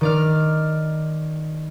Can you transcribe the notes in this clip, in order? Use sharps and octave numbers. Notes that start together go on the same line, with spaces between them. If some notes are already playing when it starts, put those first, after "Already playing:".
D#3 D5 F6